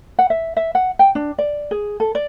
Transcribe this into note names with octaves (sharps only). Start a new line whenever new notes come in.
F#5
E5
E5
F#5
G5
D4
D5
G#4
A4
D5